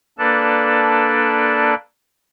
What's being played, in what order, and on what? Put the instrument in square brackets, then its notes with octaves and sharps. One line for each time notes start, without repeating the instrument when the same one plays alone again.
[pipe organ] A#3 D4 A4 B4 D5 A5